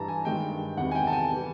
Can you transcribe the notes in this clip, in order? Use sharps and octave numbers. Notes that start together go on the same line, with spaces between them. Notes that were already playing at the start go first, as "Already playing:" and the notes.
Already playing: G2 E3 G3 A5 A#5
G#5
G2 D#3 G#3 G5
E2 C3 D#3 G3 F#5
G#5
G5
A5
G#5
E3 G3